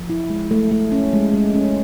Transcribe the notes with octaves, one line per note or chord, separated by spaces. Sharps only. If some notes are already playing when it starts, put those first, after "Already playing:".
Already playing: F3
E4
G#3
A3
A3
C#4
G#3
G#3
C#4